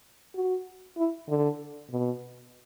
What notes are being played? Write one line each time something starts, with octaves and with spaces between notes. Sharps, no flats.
F#4
E4
D3
B2